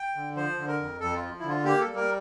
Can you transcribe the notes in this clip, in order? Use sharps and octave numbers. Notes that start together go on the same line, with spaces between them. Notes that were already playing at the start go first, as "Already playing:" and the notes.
Already playing: G5
D3
F3 C5
D3
A#4
F2
F2 A4
F4
F3
E4
D3
F4
A#3 G4
A4
G3
A#4